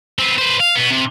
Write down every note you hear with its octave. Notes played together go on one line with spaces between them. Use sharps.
B3 C4
B4 C5
F5
B2 B3
C3